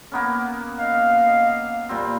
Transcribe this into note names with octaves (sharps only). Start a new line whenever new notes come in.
A#3 B3 C#4
D#5 F5
A#2 G3 C4